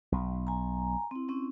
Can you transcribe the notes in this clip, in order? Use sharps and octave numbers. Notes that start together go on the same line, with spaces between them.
B1
G#5 A#5
C4 E4
C4 C#4 E4